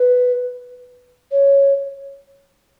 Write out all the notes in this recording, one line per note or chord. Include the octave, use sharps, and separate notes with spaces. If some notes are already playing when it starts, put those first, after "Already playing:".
Already playing: B4
C#5